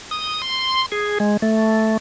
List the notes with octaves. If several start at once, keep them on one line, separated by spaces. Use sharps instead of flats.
D#6
C6
G#4
G#3
A3